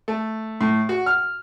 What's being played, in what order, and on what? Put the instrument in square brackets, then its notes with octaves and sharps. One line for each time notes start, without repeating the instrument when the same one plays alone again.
[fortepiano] A3
A2
F#4
F6